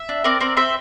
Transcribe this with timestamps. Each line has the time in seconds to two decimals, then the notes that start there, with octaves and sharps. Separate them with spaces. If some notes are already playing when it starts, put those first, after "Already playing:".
Already playing: E5
0.09 D4
0.24 C4 A#4 D5
0.40 C4 A#4 D5
0.57 C4 C5 E5